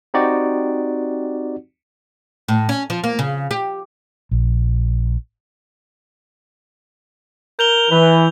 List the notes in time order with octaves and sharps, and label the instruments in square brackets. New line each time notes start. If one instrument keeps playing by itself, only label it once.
[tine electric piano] C4 D#4 F#4 G4 D5 F#5
[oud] A2
C#4
F3
A#3
C#3
G4
[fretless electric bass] A#1
[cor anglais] A#4 [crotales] G6 F7 G7
[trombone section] E3 [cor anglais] B4